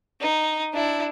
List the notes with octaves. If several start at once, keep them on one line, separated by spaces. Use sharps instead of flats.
D#4
D4 E4